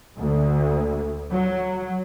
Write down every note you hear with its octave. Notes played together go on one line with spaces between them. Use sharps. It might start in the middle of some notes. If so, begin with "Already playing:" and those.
D2
F#3